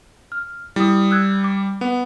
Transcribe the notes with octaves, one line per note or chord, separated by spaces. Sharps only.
F6
G3 E4 D#6
E6 F#6 G#6
D6
B3 F#5